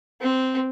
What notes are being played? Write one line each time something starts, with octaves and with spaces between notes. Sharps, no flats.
C4